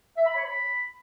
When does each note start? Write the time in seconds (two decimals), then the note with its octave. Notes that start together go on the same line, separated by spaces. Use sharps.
0.17 E5
0.27 B5
0.36 C#5
0.45 B5